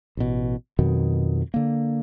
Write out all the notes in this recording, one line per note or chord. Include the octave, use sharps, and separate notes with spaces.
A1 B2
F2 B2 D#3 F#3
D3 A#3